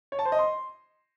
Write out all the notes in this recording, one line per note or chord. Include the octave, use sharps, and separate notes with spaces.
C#5
A5
C5
D#5
C6